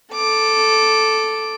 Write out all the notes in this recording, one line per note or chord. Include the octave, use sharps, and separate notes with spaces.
A4 D6